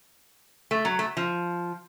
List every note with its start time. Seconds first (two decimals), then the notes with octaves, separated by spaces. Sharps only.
0.71 A3
0.85 F#3
0.99 A3
1.17 F3